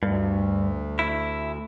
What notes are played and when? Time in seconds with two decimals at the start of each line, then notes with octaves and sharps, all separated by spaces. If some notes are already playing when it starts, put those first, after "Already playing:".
0.03 D2 G2
0.99 E4